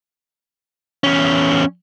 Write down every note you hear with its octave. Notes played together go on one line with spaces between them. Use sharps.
E2 C#4